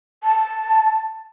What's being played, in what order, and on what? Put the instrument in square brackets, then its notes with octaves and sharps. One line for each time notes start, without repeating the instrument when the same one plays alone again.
[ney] A5